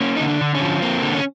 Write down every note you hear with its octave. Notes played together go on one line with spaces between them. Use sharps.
A#3 C#4
D3 D#4
D4
D3
C#4
F3
A#3 C4
D3
C#4